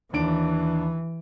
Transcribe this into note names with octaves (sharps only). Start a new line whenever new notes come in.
D#2 E3 D4 D7